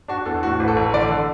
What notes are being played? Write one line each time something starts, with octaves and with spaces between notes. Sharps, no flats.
D4 F#4
E2 A4
A2 F#4
A1
A4
A1
D3 A4 D5
D3